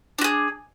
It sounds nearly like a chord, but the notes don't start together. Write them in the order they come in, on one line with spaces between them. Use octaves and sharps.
D4 F#4 G#4